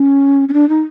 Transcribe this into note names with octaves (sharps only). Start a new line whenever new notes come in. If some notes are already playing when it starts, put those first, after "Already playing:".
Already playing: C#4
C#4
D4
D#4